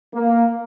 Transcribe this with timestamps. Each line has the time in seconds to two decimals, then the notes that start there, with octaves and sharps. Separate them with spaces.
0.13 A#3